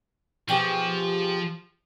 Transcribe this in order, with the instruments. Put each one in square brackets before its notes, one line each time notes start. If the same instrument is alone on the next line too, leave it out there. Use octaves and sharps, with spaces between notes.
[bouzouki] B2 G4 G#4 [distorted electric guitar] F3